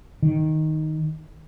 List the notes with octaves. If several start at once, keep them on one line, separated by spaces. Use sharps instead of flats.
D#3